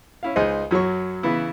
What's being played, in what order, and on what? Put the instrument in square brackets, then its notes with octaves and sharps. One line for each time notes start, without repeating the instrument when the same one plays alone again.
[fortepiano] C#4 E4 F5
C#2 D#4 G#4 C5 D#5
F#2 F#3 C#5 C#6
C#3 E3 B3 E4